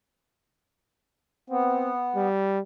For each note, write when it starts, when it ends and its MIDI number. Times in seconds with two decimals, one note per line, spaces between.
1.50 2.27 59
1.50 1.91 60
2.16 2.60 55